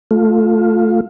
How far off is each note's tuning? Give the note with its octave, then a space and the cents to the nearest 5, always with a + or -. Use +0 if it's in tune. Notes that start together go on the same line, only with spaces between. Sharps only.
A3 +0 F4 +15